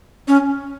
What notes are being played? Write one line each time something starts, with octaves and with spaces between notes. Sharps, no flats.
C#4